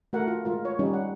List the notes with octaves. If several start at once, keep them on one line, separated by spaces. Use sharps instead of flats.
A3 F#4 A#4 F#5
F4
G#3 F4 A#4
C#5
G3 C#4 D#4
F#5